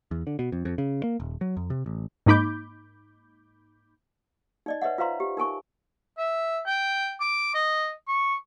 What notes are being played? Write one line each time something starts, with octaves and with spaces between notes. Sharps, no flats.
E2
D3
B2
F2
F2
C#3
A#3
D#1
F#3
F2
C3
A1
G#2 A#3 D#4 B5 D6 G6
D#4 D5 D#5
B4 C#5 D#5 E5 F#5
F4 B4 C5 F5 A#5 C6
G4
D#4 A#4 G#5 C#6
E5
G5
D6
D#5
C#6